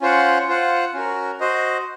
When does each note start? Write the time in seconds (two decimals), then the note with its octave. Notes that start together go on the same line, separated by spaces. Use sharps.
0.01 C#4 F4 C5 F#5
0.48 F4 C5 F#5
0.94 C#4 F#4 A#4
1.40 F#4 C5 D#5